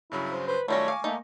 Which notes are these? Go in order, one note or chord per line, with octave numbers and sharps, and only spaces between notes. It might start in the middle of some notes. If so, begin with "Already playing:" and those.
G2 C#3 F#3 E4
C5
B4 C5
D#3 F#3 G3 A3 C#4 F4 C#5 A#6
F5 G#5 C#6 D6
A3 A#3 D#4